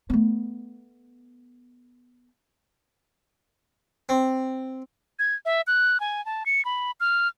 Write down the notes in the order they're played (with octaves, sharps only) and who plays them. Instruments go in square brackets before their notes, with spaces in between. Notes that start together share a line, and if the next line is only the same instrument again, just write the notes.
[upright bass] A3 B3
[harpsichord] C4
[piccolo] G#6
E5
F#6
G#5
A5
C#7
B5
F6